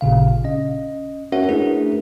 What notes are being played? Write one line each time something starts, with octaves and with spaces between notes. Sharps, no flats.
A1 A#2 C#3 F5
C#4 D#5
C#4 F#4 A#4 C#5 E5 F#5
A3 D4 E4 G#4 A#4 B4